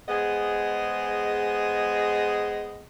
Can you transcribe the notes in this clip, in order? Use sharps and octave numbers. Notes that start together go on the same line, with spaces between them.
G#3 B3 G#4 C5 D#5